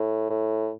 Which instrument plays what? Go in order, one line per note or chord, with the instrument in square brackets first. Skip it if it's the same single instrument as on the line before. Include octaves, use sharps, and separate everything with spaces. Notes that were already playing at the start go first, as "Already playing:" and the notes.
Already playing: [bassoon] A2
A2